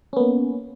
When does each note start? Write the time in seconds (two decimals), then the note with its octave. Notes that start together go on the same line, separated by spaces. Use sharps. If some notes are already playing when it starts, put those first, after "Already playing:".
0.13 C#4
0.16 B3
0.20 A#3